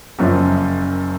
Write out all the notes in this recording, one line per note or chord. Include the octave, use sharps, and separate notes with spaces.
F#1 F#2 F3